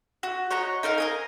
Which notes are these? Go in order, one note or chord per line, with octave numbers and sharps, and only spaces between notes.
F#4
C#5 D#5 F#5 A#5
D#4 A#4 F5 A#5
A#4 D#5 G#5